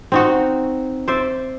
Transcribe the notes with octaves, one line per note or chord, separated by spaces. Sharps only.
C4 D#4 F#4
C5 D5 E5